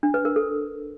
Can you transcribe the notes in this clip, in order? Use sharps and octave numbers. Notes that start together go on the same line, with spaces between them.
D4
B4
A#4
A4